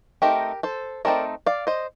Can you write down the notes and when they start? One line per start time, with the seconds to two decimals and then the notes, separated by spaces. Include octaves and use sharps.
0.22 A3 C4 D#4 G4 A#4
0.63 A4 C5
1.05 A3 C4 D#4 A#4 D5
1.46 D5 F5
1.67 C5 D#5